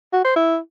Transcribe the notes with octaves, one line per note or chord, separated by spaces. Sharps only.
F#4
C5
E4